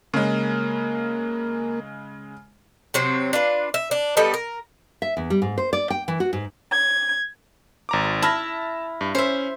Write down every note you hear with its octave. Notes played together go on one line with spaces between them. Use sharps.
C#3 G#3 A#3
C3 F#3 C4
D4 F4 B4
E5
D4
G3 B3 A4 D#5
A#4
E5
E2
G3
G#2
C5
D5
G5
E3
F#4
G#2
G#6
G#1 A#5 D6
E4 A5 F6 A#6
G2
C#4 C5 E5